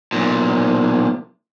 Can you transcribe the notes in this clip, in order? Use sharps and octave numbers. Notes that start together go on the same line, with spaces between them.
B1 A#2